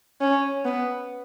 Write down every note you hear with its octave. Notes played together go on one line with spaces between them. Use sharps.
C#4
B3